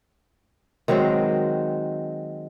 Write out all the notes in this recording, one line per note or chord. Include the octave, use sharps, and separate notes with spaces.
D#3 F#3 G#3 C4